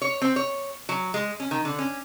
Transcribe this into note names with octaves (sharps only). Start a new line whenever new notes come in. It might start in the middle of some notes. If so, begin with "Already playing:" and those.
C#5
C4
C#5
F#3
G#3
C#4
D#3
D3
C#4